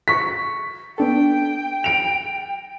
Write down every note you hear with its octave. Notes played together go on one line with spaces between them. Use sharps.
C#6 B6
B3 D4 A4 G5
D7 F7